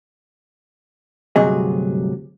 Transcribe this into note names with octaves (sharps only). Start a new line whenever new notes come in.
D2 G2 C3 F#3 G#4 D#5